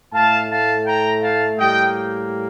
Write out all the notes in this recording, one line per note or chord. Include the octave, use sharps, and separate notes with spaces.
A2 A3 F5 A5
F5 A5
G5 A#5
F5 A5
A2 G3 A#3 D#5 G5